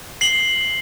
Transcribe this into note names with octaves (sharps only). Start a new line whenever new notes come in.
C7 F#7 G7